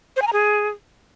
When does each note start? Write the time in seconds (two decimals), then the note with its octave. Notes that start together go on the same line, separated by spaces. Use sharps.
0.16 C5
0.22 G#5
0.27 A#5
0.33 G#4